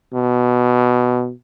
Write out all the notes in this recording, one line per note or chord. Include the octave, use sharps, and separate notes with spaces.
B2